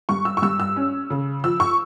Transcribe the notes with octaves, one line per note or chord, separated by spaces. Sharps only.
G2 C#6
E6
C#6
G2 E6
E6
C#4
C#3
F3 E6
C#6